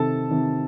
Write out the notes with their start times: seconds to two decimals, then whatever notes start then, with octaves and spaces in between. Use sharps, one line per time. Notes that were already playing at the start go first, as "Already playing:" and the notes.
Already playing: C3 D#3 A4 A5
0.31 C3 D#3